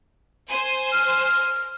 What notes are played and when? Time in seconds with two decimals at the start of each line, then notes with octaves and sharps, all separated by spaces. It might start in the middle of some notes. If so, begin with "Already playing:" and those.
0.48 C5 G#5
0.93 F6